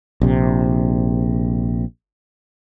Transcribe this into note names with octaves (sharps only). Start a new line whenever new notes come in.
A#1 C3